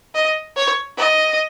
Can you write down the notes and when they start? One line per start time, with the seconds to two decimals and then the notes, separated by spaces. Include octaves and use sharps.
0.15 D#5
0.57 C#5
0.98 D#5